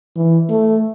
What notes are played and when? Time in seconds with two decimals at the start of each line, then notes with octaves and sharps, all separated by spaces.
0.16 E3
0.49 A3